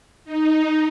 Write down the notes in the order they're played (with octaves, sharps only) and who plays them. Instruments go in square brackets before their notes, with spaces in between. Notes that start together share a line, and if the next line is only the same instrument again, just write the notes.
[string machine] D#4